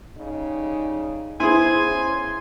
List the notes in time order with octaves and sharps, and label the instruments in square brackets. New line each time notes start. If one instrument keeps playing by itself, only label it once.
[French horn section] C#3 G3 D#4
[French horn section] B3 C5 [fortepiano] E4 G#4 [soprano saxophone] G#5 [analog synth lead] C6
[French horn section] C#3